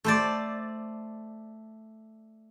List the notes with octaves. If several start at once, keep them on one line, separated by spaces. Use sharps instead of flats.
A3 C5 D5